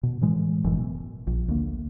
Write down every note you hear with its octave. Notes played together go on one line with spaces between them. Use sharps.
B2
A2 E3 G#3
F#1 F#2 A2 E3
B2
A#1
D2 A#3